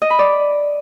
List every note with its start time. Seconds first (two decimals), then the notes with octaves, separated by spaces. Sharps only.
0.02 D#5
0.10 B5
0.19 D5